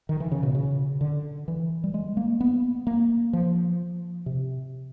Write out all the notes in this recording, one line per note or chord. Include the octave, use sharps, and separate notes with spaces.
D#3
E3
C#3
B2
C#3
D3
E3
G3
G#3
A#3
B3
A#3
F3
C3